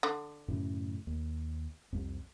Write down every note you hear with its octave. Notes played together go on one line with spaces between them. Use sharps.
D3
F#2 A2 C#3
D#2
C2 F2